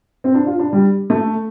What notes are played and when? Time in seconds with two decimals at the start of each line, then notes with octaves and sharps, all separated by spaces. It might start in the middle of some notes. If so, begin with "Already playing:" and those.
0.24 C4
0.34 D4
0.47 F4
0.59 D4
0.73 G3
1.10 A3